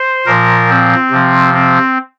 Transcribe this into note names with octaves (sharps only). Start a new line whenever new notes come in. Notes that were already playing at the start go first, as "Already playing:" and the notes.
Already playing: C5
A#2 F3 A#4
C4
C3 F3
C4